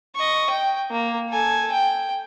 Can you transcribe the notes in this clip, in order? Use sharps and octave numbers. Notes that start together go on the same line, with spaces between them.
D#5 C#6
G5
A#3
A4 G#5
G5